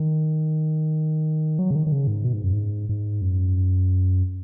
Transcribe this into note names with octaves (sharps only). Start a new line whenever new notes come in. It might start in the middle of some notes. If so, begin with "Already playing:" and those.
Already playing: D#3
F#3
C#3
D#3
D#3
C#3
G#2
B2
G#2
F#2
G#2
G#2
F#2